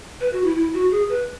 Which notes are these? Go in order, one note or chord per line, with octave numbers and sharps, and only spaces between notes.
B4
F#4
E4
E4
F#4
G#4
B4